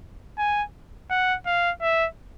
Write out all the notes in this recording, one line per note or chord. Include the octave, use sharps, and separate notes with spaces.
G#5
F#5
F5
E5